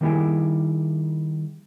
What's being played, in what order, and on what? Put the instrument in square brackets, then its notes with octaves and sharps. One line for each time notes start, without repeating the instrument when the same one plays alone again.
[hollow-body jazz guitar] D#3 G3 A#3 E4 G4 G#4